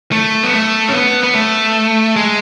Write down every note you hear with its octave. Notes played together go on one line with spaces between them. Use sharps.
A3
B3
A3
C#4
B3
B3
A3
G#3